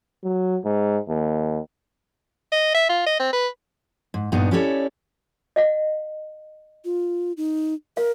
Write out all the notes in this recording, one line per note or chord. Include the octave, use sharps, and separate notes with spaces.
F#3
G#2
D#2
D#5
E5
F4
D#5
C4
B4
G#2
G2 A#2 B3 D4 D#4
C#4 E4 G4 A4 C#5 D5
D#5 F5 F#5
F4
D#4
A#4 F5